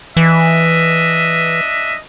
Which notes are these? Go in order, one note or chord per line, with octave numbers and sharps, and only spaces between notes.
E3 D4 D#5 E5